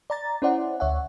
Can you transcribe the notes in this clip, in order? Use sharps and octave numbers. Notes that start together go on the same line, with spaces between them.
D5 A#5 A6
C#4 E4 C5 D5 F#5
D2 C#5 E5 F#5